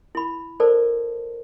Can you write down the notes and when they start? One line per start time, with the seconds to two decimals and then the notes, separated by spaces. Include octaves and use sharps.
0.15 E4 B5
0.60 A4 A#4 C5 D5 A5